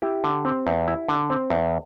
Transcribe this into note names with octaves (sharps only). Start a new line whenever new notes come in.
E4 G4
D3
C4
E2
E4
D3
C4
E2